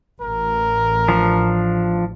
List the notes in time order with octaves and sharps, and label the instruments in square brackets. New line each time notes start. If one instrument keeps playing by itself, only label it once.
[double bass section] A1 [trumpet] A#4
[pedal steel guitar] F3 D4